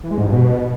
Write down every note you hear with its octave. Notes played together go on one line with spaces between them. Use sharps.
E3
G#3
G#2
G2
B2